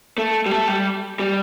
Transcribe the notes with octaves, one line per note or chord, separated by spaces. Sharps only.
A3
G3
A3
G3
G3